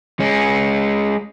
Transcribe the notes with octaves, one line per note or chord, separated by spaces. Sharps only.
G#3 C#4